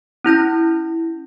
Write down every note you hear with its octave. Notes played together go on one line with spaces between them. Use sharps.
C#4 E4 G6 A#6